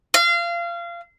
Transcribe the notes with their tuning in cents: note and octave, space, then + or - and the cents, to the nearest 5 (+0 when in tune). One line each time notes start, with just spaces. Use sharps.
F5 -25